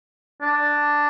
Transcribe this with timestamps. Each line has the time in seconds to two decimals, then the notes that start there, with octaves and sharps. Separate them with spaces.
0.42 D4